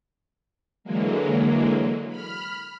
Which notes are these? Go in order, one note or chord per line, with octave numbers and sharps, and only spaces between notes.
D3 E3 F#3 G#3 A#3
B5 F6